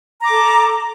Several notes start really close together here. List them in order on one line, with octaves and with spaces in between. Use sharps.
A#5 D6 A4